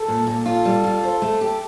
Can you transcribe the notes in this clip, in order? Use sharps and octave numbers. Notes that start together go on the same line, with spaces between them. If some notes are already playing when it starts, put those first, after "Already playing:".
Already playing: A4
A#2
A#2
F4 A4
G3
F4
C5
A3
G4